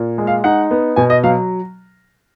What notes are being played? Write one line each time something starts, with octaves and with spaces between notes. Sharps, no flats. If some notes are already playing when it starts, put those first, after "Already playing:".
Already playing: A#2
G#3
F5
D#4 F#5
B3
B2 G#5
D#5
F#3 F5